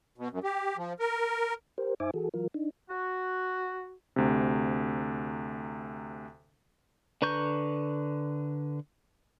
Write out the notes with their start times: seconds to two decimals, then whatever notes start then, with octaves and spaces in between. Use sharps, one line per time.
0.18 B2
0.31 F#2
0.44 G4
0.77 F3
1.00 A#4
1.78 G4 A#4 C5
2.00 F#2 D#4 C5 E5 G#5 D6
2.14 E3 F#4 G#4 A4
2.34 E3 F#3 F4 A#4
2.54 D4 D#4
2.90 F#4
4.16 D2 C3
7.22 D3 B4 A#5 C#6 G6